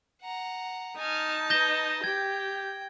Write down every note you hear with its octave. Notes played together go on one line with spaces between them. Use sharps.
F#5 A#5
D#4 G#5 A5 F6
B4 D#5 G6 A#6 G7
G4 G5 G#6